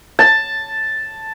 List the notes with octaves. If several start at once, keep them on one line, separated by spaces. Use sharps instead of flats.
A5